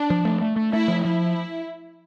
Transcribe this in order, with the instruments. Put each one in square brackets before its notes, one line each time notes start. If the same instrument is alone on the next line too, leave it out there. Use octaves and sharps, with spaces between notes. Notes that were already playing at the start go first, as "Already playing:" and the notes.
Already playing: [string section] D4
[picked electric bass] F3
A3
A3
A3
[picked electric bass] A3 [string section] E4
[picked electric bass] F3
[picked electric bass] F3 [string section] E4